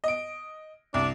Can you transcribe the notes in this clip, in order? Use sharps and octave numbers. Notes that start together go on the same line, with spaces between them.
D#5 D7
C2 D4